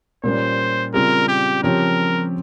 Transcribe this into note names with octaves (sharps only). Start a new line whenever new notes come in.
A#2 G3 A#3 C#4 C5
C#3 G3 C4 F4 G#4 A#4
G4
C#3 F3 C4 G4 A#4 C#5